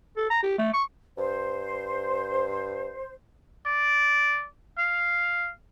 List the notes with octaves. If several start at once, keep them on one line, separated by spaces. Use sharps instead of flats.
A4
A#5
G4
A3
C#6
G2 C5
D5
F5